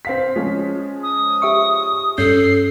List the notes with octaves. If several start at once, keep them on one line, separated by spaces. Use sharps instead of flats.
C4 F5 B6
F3 G#3 C#4
D#6
G4 E5 C#6
G2 C#4 A4 G6 C7